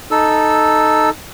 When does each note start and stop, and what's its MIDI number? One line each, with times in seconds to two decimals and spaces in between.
0.11 1.10 63
0.11 1.10 69
0.11 1.10 88